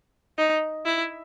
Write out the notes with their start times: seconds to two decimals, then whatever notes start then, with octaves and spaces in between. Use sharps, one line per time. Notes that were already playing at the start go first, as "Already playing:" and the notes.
0.38 D#4
0.85 E4